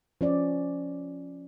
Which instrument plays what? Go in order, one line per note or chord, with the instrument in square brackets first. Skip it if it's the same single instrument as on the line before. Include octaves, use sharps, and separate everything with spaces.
[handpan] F3 C#4 D5